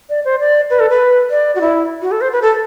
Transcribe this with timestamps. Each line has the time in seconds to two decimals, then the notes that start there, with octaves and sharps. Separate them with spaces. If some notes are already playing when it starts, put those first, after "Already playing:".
0.09 D5
0.25 C5
0.40 D5
0.70 B4
0.79 A4
0.90 B4
1.30 D5
1.55 F#4
1.61 E4
2.01 F#4
2.11 A4
2.21 C5
2.32 B4
2.42 A4